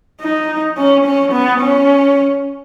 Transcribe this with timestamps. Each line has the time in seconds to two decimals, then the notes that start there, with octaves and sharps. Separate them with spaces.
0.22 D#4
0.77 C#4
1.06 C#4
1.33 B3
1.61 C#4